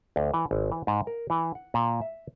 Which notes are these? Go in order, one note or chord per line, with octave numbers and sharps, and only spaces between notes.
D2
E3
G#1
E3
G#2
A#4
E3
F#5
A#2
E5